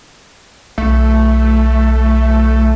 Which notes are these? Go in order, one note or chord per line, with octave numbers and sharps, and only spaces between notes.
B1 A3